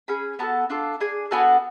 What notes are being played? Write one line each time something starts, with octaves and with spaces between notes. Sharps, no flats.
C#4 G#4 B5
B3 F#4 A4 A5
D4 F4 A4
D4 G#4 G#5
B3 D4 F#4 A4 G#5